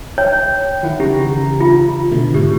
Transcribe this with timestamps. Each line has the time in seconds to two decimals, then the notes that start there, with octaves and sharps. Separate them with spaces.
0.18 C#5 G5
0.83 D#3 E4 F#5
1.00 C#3 E3 G4 A#5
1.61 F4
2.11 B2 D3 A3
2.34 G#2 G4